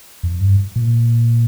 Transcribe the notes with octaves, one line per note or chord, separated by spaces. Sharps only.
F2
G2
A#2